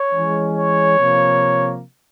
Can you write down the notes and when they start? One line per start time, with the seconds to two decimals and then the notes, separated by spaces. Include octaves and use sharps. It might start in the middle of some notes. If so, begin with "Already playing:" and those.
Already playing: C#5
0.10 E3 G#3 C#4
0.53 C#5
0.96 C3 F3 A#3